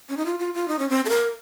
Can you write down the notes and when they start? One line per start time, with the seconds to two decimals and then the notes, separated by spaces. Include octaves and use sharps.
0.09 C#4
0.17 D#4
0.26 F4
0.39 F4
0.54 F4
0.68 D#4
0.79 C#4
0.90 C4
1.06 A4
1.09 A#4